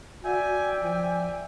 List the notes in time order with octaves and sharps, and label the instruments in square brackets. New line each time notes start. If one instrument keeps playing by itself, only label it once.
[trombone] F#4 [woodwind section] D5 E5 G5 [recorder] G#5
[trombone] F3 [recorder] G#5